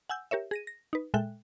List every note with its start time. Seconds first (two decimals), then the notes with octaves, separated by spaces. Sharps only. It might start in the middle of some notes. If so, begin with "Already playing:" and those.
0.09 F#5 G#5 E6 G6
0.31 G4 A#4 C#5 E5
0.51 G#4 A#6 D#7
0.67 A#6
0.93 D#4 B4
1.14 A#2 G#3 A4 E5 G5 F#6